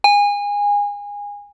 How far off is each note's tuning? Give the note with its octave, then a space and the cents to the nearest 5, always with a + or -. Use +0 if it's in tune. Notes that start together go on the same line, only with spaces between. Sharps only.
G#5 -25